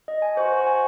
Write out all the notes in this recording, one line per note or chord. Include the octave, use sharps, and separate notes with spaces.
D#5
G#5
F#4 C5
C5
G#5